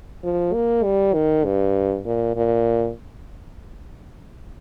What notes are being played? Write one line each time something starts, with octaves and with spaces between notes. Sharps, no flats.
F3
A#3
G3
D#3
G2
A#2
A#2